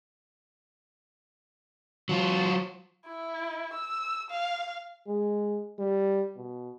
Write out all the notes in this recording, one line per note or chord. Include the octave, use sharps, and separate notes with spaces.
F#3 F4
E4
E6
F5
G#3
G3
B2